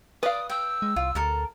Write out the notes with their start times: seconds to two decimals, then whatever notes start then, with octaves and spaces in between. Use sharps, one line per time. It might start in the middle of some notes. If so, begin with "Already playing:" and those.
0.23 B4 D5 F5 D#6
0.50 G5 E6
0.82 G#3
0.96 C2 F4
1.15 D2 A4 A#4 A5